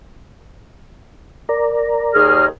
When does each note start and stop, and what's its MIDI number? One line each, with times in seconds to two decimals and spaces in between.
1.49 2.48 70
1.49 2.48 74
1.49 2.48 82
2.14 2.44 39
2.14 2.44 68
2.14 2.44 89